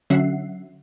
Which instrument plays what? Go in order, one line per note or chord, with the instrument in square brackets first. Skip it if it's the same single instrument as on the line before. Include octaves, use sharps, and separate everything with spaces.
[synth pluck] D3 F#3 C#4 E5 F#5 C7